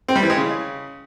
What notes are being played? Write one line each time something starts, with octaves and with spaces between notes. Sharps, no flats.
C4
G3
E3
G#3
C#3